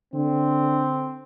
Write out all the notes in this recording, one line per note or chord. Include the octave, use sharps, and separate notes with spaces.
D3 C4